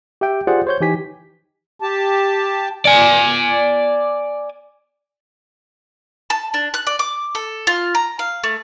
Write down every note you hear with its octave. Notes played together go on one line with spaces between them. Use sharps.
G4 E5 G5
F4 G4 G#4 C5 D5 F#5
C5 C#5 G6
E3 D#4 G4 G#5 B6
G4 A5
D5 G#5
A5
D4
F#6
D5
D6
A4
F4
A#5
F5
A3